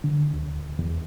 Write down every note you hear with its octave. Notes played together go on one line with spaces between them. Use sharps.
D3
D2
E2